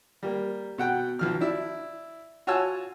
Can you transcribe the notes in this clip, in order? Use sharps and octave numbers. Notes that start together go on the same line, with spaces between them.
G3 A#3
B2 F#5 G5
B1 F3 F6
E4 D5
F4 F#4 C#5 G#5 A5 E6